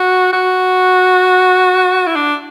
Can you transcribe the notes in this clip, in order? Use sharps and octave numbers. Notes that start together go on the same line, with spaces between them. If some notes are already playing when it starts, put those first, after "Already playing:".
Already playing: F#4
F#4
E4
D4